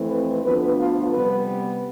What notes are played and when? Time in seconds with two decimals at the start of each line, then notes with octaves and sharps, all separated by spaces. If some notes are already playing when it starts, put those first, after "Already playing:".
Already playing: F2 E3 A3 C4
0.10 B4
0.44 D2 D3 F3 B3 B4
0.79 F4
1.13 C3 G3 B3 B4